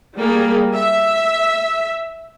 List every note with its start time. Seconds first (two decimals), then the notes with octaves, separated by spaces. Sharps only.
0.16 G3 A#3 G#4
0.76 E5